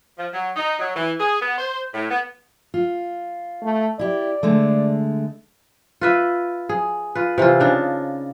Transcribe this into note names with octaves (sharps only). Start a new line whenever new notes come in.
F3
F#3
D#4
F#3
E3
G#4
B3
C5
A2
B3
F4
A3
E4 G4 D5
D3 G#3 A3
F4 B4 E5
G#4
F4 B4
C3 E3 C4 F4
C#3 D4 D#4